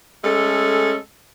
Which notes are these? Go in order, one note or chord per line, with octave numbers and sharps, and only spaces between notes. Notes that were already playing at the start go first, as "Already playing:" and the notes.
G#3 A3 C#4 A4